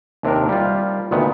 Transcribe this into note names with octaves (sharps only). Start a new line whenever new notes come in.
D#2 C3 D4 A#4
G3 F4
D2 A#2 D#3 B3